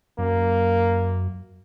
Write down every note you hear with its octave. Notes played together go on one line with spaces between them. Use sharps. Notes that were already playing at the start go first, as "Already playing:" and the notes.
F#2 A#3